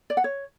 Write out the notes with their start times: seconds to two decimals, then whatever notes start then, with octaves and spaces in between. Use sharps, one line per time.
0.10 D5
0.17 F#5
0.24 C#5